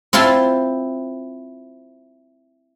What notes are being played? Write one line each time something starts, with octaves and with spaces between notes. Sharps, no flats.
C4 E4 F4 A5 C6